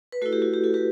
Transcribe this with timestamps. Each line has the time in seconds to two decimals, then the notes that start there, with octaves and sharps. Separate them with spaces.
0.12 B4
0.22 A3 E4 F#4 A4
0.33 G4
0.42 F#4
0.54 G4
0.64 F#4 A4
0.74 G4 B4